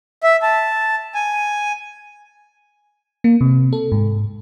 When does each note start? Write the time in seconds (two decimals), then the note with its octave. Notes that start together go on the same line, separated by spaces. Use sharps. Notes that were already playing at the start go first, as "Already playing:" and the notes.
0.23 E5
0.42 A5
1.15 G#5
3.24 A#3
3.41 C3
3.73 A4
3.92 G#2